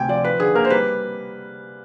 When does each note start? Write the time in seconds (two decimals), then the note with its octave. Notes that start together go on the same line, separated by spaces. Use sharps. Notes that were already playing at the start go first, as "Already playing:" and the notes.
Already playing: D2 C3 G5 G#5
0.09 F3 D5
0.24 F3 B4
0.40 D3 G#4
0.55 A#3 A#4
0.65 C5
0.70 G3 B4